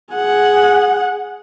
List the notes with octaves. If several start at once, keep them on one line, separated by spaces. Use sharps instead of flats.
G#4 F#5